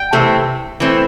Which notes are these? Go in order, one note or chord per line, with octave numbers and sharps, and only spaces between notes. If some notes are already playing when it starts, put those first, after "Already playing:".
Already playing: G5
C3 E3 A3 C4
E3 A3 C4